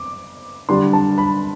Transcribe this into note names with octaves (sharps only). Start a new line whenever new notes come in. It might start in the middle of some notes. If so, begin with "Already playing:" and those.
Already playing: D6
D3 G3 D4 C6
A5
B5